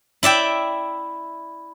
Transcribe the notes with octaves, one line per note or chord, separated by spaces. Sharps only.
E4 D5 E5 G5